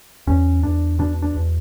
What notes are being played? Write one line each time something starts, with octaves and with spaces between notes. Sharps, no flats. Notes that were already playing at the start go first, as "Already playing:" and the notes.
E2 C#4
E2 D4
B2 D4
D4
E2